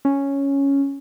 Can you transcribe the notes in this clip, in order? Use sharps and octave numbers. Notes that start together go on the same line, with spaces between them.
C#4